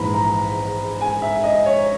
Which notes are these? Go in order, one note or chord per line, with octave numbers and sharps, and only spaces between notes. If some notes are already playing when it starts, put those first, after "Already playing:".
Already playing: A#1 G#2 E3 A#5 B5
A#5
G#5
E5
D#5
C#5